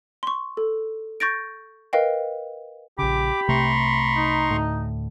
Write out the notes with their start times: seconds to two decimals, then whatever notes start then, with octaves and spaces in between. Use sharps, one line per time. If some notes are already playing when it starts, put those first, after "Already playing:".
0.23 C6 C#6
0.57 A4
1.20 C#6 G6 A6 A#6 D7
1.93 A#4 B4 D#5 F5 G5
2.99 A#1 C#3 G4 B5 D6
3.49 C2 C3 A3 A#5 C6 C#6
4.16 D#4
4.51 D2 A2